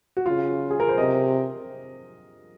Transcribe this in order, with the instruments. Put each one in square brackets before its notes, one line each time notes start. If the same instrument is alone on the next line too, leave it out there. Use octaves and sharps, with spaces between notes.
[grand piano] F#4
[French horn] C#3 [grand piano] F4
[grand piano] G#4
A#4
C5
[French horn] C3 [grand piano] D#5